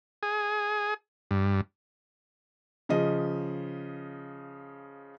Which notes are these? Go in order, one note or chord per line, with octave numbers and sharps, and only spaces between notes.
G#4
G2
C#3 F3 D#5